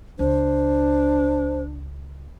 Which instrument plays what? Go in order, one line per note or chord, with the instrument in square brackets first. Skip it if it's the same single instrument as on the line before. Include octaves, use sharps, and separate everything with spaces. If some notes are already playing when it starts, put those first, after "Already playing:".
[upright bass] C#2 [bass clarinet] D4 [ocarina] C5